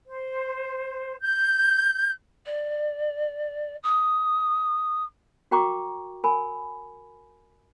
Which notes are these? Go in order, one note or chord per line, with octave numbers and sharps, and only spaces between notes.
C5
G6
D5
D#6
F#4 A#4 G5 A#5 C#6 D6
A#4 G#5 B5